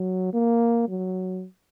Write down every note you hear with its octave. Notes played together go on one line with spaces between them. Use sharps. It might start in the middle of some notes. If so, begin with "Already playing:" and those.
Already playing: F#3
A#3
F#3